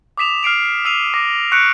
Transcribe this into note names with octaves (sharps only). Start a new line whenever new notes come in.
D6 D#6 B6 E7 F7
F6 C7 D7 F7
E6 C7 D#7 F7
D6 A#6
C#6 F#6 C#7 D7